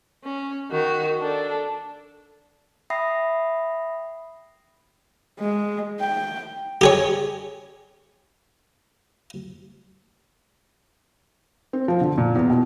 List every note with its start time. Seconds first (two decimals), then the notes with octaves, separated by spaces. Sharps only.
0.24 C#4
0.71 D#3 F#4
1.19 D4 A4
2.90 E5 G5 B5 D#6 A#6 C7
5.40 G#3
6.00 G5
6.81 G4 G#4 C#5
11.73 C4
11.88 F3
12.01 D3
12.18 A#2
12.36 E2
12.50 B2